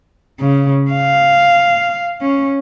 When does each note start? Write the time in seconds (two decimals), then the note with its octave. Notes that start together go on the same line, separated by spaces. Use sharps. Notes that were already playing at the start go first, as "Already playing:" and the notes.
0.40 C#3
0.90 F5
2.21 C#4